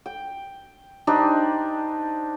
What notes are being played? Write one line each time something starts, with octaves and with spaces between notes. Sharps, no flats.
G5
D4 D#4 G4 C5